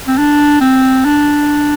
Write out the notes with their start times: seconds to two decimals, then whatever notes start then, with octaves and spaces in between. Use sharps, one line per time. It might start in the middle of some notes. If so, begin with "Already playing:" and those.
0.08 C4
0.18 D4
0.61 C4
1.05 D4